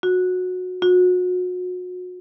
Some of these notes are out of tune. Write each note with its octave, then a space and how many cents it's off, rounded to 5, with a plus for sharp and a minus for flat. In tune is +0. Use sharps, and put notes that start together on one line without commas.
F#4 -20
F#4 -35